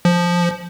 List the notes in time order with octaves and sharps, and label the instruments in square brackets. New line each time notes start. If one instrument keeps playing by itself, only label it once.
[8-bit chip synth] F3